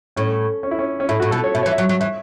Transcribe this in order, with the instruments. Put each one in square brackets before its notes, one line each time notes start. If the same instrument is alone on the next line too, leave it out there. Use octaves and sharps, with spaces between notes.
[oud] A2 [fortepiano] C#4
[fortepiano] C#4
E4
C#4
C#4
[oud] A2 [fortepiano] E4
[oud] A2 [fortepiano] F#4
[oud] B2 [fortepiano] A4
[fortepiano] C#5
[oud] B2 [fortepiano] E5
[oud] E3 [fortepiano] C#5
[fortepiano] E5
[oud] F#3
F#3
[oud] E3 [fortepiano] E5